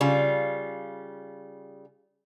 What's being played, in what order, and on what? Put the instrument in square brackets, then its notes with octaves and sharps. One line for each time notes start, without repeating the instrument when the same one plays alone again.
[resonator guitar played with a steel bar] C#3 G3 F4